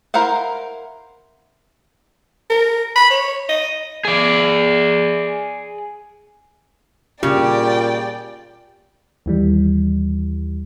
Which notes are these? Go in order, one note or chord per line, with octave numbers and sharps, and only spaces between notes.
E4 A#4 C5 F5 F#5
A#4
B5
C#5
D#5
G#4 D5
A#2 C#3 G4 D5 G5
D#2 E3 G3